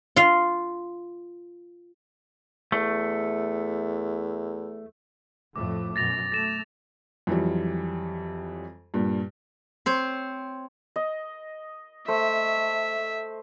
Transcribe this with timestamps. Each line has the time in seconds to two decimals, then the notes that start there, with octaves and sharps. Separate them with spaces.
0.16 F4 F5
2.72 E2 A3
5.56 F2 A2 A3 D6
5.96 F#2 B2 A6 A#6 F7
6.32 A3 A#6 E7
7.27 F2 E3 F#3 G3
8.94 G2 A#2
9.86 C4 C5 C#5
10.96 D#5
12.08 A3 C5 E5